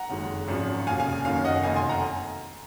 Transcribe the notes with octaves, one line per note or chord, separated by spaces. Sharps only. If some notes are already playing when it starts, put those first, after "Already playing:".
Already playing: F#5 A#5
F#1 F2 D#3 G#3
G#1 F#2 F3
F1 D#2 C#3 F5 G#5
F5 G#5
F#1 F#2 D#3 A#3 F5
D#5 F#5
F1 F2 D#3 F5 G#5
G#5 C6
F#5 A#5